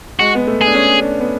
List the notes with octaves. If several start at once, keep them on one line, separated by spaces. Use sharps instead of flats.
G#3 F#4
B3
A3
G#4
D4
C#4
D4
B3